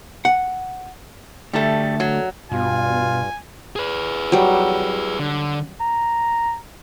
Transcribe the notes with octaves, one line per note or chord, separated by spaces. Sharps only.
F#5
D2 G3 A3 A4
F#3
G2 B2 F4 G#5
G#4 B4
F#3 G3
D3
A#5